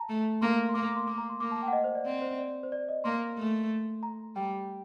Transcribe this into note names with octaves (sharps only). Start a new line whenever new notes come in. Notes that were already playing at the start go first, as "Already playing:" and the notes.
Already playing: A5 A#5
A3
A#3 C6
C6
A#3 D6
D6
C6
A#3 D6
A#5
C6
A#3 D6
A5
G5
F#5
D#5
C5
D5
C4 D5
C5
D5
C5
D5
D#5
A#3 C6
A3
A#5
G3 G5